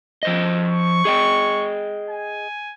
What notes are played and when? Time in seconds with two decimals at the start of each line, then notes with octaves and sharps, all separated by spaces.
0.23 F3 C5 D#5
0.67 C#6
1.05 G#4 D#5 G5
2.10 G#5